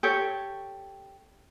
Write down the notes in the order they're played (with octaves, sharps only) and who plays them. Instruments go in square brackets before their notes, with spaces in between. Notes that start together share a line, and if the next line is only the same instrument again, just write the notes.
[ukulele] G4 A4 C#5